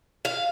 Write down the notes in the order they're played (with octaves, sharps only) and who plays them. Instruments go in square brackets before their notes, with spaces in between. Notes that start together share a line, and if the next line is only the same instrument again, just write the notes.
[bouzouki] F5